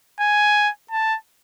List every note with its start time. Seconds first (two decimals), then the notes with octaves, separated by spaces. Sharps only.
0.20 G#5
0.91 A5